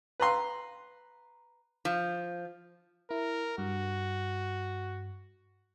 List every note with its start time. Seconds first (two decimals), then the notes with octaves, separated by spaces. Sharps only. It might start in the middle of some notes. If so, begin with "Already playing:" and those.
0.20 B4 A#5 C6
1.85 F3
3.11 E4 A#4
3.58 G2 F#4